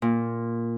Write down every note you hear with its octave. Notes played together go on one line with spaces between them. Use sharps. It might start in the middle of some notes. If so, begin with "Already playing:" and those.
A#2